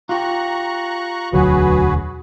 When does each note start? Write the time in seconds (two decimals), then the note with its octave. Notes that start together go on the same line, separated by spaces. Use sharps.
0.09 F4 G4 A#5 C#6 F#6
1.33 E1 D2 D3 F#3 F#4 G#4 B4